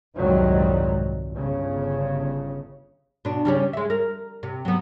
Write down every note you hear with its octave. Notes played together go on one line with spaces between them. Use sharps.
C2 F2 G#2 D#3 F#3 G3
G1 C#3
B2 D4
C#3 G3 C#4
G#3 E5
A#4
C3
F#3 B3